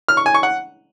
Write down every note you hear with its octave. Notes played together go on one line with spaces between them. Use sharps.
F6
C#6
G#5
C#6
F#5